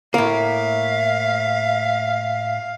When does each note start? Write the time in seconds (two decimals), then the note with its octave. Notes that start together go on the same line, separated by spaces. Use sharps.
0.14 A2 A#3 E5 F5